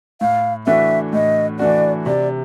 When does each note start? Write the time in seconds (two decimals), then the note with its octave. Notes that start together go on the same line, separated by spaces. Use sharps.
0.21 A2 F5
0.67 E3 A3 D4 F#4 E5
1.13 A2 D#5
1.59 E3 A3 D4 F#4 D5
2.06 C3 D5